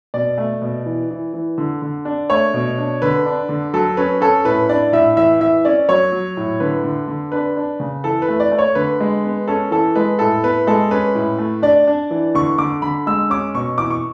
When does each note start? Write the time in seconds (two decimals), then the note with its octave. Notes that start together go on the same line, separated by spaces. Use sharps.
0.14 B2 D5
0.38 A3
0.62 B2
0.86 E3
1.11 E3
1.33 E3
1.58 D3
1.82 D3
2.05 D4
2.30 A3 C#5
2.54 B2
2.78 D4
3.02 D3 B4
3.26 D4
3.49 D3
3.74 F#3 A4
3.97 C#4 B4
4.21 C#4 A4
4.45 A2 B4
4.69 D4 D5
4.93 A2 E5
5.17 E3 E5
5.40 E3 E5
5.65 C#4 D5
5.89 F#3 C#5
6.12 F#3
6.37 A2
6.60 D3 B4
6.84 D3
7.08 D3
7.32 D4 B4
7.57 D4
7.80 C#3
8.04 E3 A4
8.22 B4
8.29 A3
8.40 D5
8.52 A3
8.58 C#5
8.75 D3 B4
9.00 G#3
9.24 B3
9.48 C#4 A4
9.71 E3 A4
9.95 G#3 B4
10.19 A2 A4
10.43 B3 B4
10.67 G#3 A4
10.91 C#4 B4
11.15 A2
11.39 A3
11.62 D4 D5
11.87 D4
12.11 E3
12.35 D3 C#6
12.58 D3 D6
12.82 D3 B5
13.07 G#3 E6
13.30 C#4 D6
13.55 B2 C#6
13.78 E3 D6
13.91 C#6